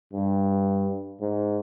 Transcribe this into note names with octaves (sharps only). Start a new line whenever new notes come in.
G2
G#2